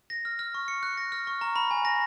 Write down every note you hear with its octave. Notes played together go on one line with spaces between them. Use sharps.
A#6
F6
F6
C#6
C#7
F#6
A#6
F6
C#6
A#5
B5
G#5
A#6